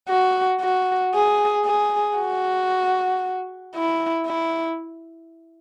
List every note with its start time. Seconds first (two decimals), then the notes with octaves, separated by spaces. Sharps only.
0.09 F#4
0.61 F#4
1.14 G#4
1.66 G#4
2.18 F#4
3.75 E4
4.27 E4